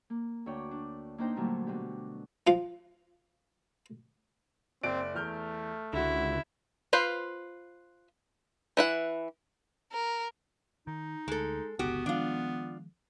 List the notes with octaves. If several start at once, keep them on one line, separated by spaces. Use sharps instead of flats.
A#3
D2 C#5 D5 G5
D4
A#3 D4 D#4 C5 G5 A#5
A#2 D3 F#3 G3 A3 A#3
B2 D4 G4
F3 F4 F5
F#1 C4 D5 D7
E2 A3 F6 G6
C#2 D3 E4 F#4
F4 B4 C5 F5
E3 E4 F#5
A#4
D#3 D#4
D2 G#3 A4
G1 C#2 B3 F#4 G4
D#3 F3 G#3 D4 F4